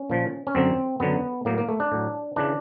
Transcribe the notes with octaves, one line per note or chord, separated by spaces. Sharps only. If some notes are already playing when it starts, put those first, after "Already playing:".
Already playing: C#4
A#2 F3
C#4
F#2 D3 F#3 C4
F#2 D3 F#3 B3
A2 F#3 A#3
A#3
A3
D4
A2 F#3
C#3 E3 D4